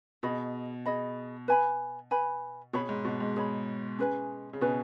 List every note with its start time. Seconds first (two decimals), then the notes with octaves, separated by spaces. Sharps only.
0.23 B2 G#4 D#5 B5
0.86 G#4 D#5 B5
1.48 B4 G#5 B5
2.11 B4 G#5 B5
2.73 B2 G#4 C#5 B5
2.89 G#2
3.05 B2
3.20 G#2
3.36 G#4 C#5 B5
3.99 C#4 G#4 B4 G#5
4.53 C#3
4.61 B2 C#4 G#4 B4 G#5